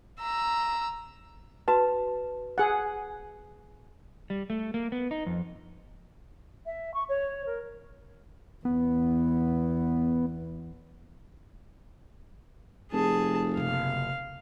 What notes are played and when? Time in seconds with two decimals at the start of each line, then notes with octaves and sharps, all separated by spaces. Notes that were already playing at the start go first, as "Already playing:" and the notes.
0.20 A#5 E6
1.68 F#4 B4 A5
2.58 G#4 F#5
4.30 G3
4.50 A3
4.74 A#3
4.92 B3
5.11 D#4
5.26 F2
6.65 E5
6.94 C#6
7.08 C#5
7.46 A#4
8.65 E2 B3
12.92 F1 G#4 A5
13.57 F#1 C3 F5